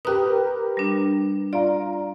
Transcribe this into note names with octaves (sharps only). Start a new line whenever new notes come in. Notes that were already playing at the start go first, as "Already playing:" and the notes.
G4 A#4 B4 D#6 F#6
G3 D4
F4 D5 A#5